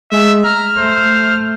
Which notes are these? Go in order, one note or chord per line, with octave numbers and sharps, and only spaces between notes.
G#3 E5
A#5 F6
A3 C5